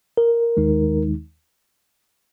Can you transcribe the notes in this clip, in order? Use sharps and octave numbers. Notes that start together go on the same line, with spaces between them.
A#4
D#2 D#3 G#3 D#4